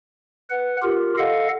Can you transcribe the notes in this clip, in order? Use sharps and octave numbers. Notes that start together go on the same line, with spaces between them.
B4 F#5
F4 G4 A#4
A4 D#5 F5 F#5